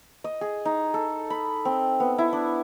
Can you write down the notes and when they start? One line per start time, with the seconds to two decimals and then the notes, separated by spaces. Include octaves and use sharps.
0.24 D#5
0.41 G#4
0.65 D#4
0.94 A4
1.30 B5
1.65 C4
2.00 B3
2.18 E4
2.33 D4